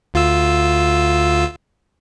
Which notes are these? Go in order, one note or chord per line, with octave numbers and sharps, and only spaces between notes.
D2 F4 E6